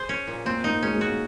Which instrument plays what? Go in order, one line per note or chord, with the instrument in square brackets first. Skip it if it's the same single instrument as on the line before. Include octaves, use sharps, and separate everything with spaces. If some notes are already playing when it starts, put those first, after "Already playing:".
Already playing: [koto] G#4 C5
C#4
A#2
[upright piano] A#3 [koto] C4
[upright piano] A#3 [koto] D#4
[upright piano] G#3 [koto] C#4
[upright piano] G#3
[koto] F#4
[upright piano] A#3